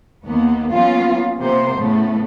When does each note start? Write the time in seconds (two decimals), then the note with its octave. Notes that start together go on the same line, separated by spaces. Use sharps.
0.25 D#2 A#3 B3
0.71 F#3 A#3 B3 C#4 F4
1.38 C3 A#3 B3 C5
1.76 A2 C#3 A3 B3